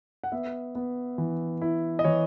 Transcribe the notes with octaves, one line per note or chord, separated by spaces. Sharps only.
F#5
B3 E5
B3
E3
E4
D#5
E3 C#5